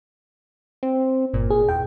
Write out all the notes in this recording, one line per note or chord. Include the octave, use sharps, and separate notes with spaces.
C4
G1 A#2
G#4
E2 G5